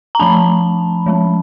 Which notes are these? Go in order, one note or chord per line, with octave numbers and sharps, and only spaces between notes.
A#5
F3 A3 D4 A5 B5
F3 G#3 C#4